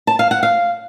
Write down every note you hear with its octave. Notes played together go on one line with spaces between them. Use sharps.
A5
F5
F#5
F5